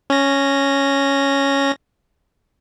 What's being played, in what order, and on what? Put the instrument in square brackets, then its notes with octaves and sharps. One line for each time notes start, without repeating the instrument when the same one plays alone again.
[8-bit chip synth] C#4 A#6